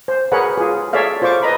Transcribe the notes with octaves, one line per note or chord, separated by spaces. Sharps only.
C5
G#4 A#4 B4 C#5 F#5
F4 G#4
G#4 A4 C#5 D5 E5 F5
F4 C5 D5 C#6 D6
B4 D#5 A#5 B5